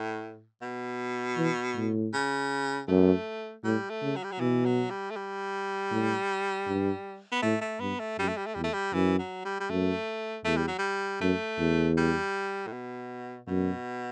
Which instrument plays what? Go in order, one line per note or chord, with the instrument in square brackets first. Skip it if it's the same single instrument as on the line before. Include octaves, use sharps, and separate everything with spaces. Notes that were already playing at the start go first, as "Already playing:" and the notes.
Already playing: [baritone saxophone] A2
B2
[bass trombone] E3
A2
[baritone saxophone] C#3
[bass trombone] F#2 [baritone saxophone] A3
[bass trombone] A2 [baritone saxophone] G3
[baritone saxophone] A3
[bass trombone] C#3
[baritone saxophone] F#3
G3
F#3
[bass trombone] B2 [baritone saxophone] E3
[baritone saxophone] F#3
G3
A3
G3
[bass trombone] A2
G2
[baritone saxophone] B3
[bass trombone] A2 [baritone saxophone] A3
[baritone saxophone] A3
[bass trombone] G2 [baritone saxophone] B3
[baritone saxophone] A3
[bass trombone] F#2 [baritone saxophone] G3
[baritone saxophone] A3
G3
A3
[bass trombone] E2 [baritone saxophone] G3
[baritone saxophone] A3
G3
[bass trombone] F#2 [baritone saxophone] E3
[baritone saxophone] F#3
G3
G3
[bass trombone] F#2 [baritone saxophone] A3
[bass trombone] E2 [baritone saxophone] A3
[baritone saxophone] G3
F#3
G3
[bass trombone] F#2 [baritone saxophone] A3
[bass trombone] E2
[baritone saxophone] G3
A2
B2
[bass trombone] F#2 [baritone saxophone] B2